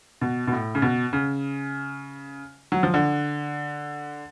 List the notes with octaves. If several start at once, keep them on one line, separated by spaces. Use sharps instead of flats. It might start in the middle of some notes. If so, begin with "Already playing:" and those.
B2
B2
A2
C#3
B2
C#3
F#3
F3
D3